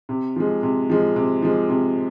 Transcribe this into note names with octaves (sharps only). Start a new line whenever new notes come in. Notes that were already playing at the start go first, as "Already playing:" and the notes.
C3
F3 G#3
C3
F3 G#3
C3
F3 G#3
C3